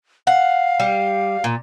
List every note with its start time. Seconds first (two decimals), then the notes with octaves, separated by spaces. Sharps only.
0.27 F5 F#5
0.80 G3
1.44 A#2